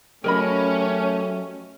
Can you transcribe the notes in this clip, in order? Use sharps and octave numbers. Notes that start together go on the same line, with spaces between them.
F#3 A3 C#4 G4 A#4 D#5 B5